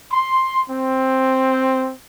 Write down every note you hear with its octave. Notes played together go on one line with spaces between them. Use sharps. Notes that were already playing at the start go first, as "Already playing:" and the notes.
C6
C4